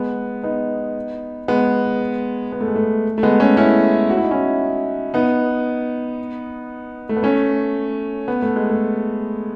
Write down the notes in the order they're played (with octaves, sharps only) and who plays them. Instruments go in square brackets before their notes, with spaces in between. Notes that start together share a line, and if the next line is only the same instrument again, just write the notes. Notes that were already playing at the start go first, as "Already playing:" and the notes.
Already playing: [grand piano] G#3 B3
B3 D#4
G#3 B3
B3
A3
G#3
A3
A3
G#3 B3
A3 C#4
C#4 E4
F#4
E4
D#4
C#4 E4
B3 D#4
A3
B3
A3 C#4
B3
A3
G#3
A3